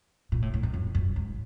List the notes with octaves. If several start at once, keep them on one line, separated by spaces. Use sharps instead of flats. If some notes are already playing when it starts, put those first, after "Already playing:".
A#2
A2
A2
F#2
F2
F#2
G#2